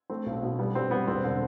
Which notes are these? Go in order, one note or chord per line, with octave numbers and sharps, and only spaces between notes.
A3 C4
B1
B2
G3 B3
G3 C4
G3 B3
E1 C4
D3